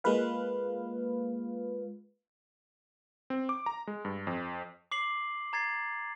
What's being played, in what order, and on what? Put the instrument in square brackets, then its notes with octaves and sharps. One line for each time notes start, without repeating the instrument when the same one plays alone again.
[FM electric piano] G#3 A#3 F4 B4 F5
[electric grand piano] C4
D6
A#5
G#3
G2
F2
[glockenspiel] D6 C7 F#7
A#5 G#6 A6 C7